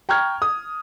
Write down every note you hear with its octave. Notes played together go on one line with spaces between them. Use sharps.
G5 A#5 C#6 F6 G#6
D#6